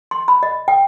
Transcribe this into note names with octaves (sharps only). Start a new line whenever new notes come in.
C6
B5
D#5
G5